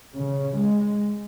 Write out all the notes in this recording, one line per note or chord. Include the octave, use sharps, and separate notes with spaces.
C#3
G#3